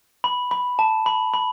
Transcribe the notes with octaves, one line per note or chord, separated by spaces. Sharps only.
B5
B5
A5
B5
B5